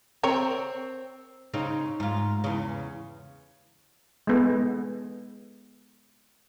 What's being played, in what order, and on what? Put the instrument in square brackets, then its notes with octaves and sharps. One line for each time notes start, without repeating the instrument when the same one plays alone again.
[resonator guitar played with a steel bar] C4 [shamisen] A#4 C#5
[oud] C#3 C4 D#4
G#2 F4
E2 C#3
[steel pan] G#3 B3 A4